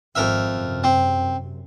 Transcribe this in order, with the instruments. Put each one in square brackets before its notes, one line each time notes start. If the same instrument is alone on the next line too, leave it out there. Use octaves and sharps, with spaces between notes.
[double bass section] G#1 [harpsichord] F2 A#4 E5
[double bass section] F#2 C3
[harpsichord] C4